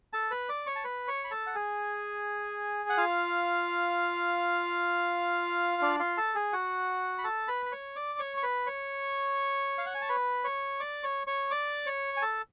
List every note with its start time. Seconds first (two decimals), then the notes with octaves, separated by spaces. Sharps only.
0.13 A4 A5
0.31 B4 B5
0.49 D5 D6
0.66 C#5 C#6
0.76 A5
0.84 B4 B5
1.08 C#5 C#6
1.24 B5
1.31 A4 A5
1.47 F#5
1.55 G#4 G#5
2.89 F#5
2.97 F4 F5
5.82 D4 D5
5.99 F4 F5
6.17 A4 A5
6.35 G#4 G#5
6.53 F#4 F#5
7.18 B5
7.24 A4 A5
7.48 B4 B5
7.66 B5
7.72 C#5 C#6
7.96 D5 D6
8.19 C#5 C#6
8.37 C#6
8.43 B4 B5
8.66 C#5 C#6
9.78 F5
9.86 F#5
9.94 G#5
10.02 A5
10.09 B4 B5
10.44 C#5 C#6
10.80 D5 D6
11.03 C#5 C#6
11.27 C#5 C#6
11.51 D5 D6
11.86 C#5 C#6
12.17 G#5
12.22 A4 A5